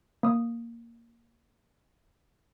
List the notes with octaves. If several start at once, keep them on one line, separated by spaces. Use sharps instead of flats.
A#3 D#6